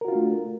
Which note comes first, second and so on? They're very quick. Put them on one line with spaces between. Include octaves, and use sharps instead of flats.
A#4 F#4 F4 D4 A3